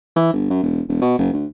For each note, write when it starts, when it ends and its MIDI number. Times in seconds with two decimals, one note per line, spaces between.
0.16 0.32 52
0.33 0.46 31
0.50 0.62 42
0.63 0.81 28
0.88 1.01 28
1.01 1.13 47
1.18 1.33 30
1.33 1.45 38